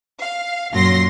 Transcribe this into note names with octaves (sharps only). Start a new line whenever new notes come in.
F5
F#2 A#2 F#3 C6 A#6